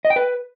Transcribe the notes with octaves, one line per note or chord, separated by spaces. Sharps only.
D#5
G5
B4